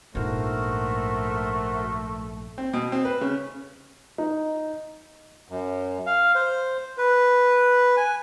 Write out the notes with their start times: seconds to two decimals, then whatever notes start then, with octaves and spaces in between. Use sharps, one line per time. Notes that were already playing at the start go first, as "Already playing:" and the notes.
0.15 A#1 G#2 A3 F#4 A#4 C5
2.58 C4
2.73 B2
2.92 C4
3.05 B4
3.21 C#3
4.18 D#4
5.48 F#2
6.06 F5
6.35 C5
6.98 B4
7.97 G#5